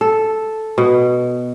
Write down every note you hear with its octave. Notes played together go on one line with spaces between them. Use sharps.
A4
B2